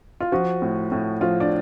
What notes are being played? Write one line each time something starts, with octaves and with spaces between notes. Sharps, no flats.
F4
F3 F#4
A2
A2
F3 F4
D4